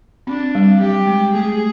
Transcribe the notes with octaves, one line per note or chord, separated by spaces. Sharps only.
C4 D4
G3
F#3 G4
G#3
A3 G#4